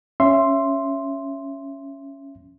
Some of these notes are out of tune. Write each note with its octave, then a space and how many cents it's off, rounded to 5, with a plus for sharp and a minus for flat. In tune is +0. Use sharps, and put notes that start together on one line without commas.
C#4 +0 E5 +20 C6 +0